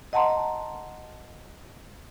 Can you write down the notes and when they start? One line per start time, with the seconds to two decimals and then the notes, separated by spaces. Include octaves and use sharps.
0.13 D#5 F#5 A5 A#5 C6